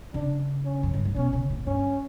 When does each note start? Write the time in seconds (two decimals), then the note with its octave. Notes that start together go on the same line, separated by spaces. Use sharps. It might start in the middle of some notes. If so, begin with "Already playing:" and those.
0.14 C#3 D4
0.65 C#4
0.83 F#2
0.94 G2
1.05 A2
1.15 B2 C#4
1.33 C#3
1.50 A2
1.66 G2 C#4